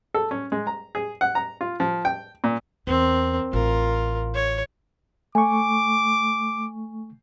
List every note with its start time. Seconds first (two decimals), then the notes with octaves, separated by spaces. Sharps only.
0.14 A4
0.31 C#4
0.52 G#3
0.67 A#5
0.95 G#4
1.21 F#5
1.35 A#5
1.61 F4
1.80 F3
2.05 G5
2.44 A#2
2.87 E2 C4 A#4
3.53 A1 F4 A#4
4.34 C#5
5.35 A3 G#5 C#6 D6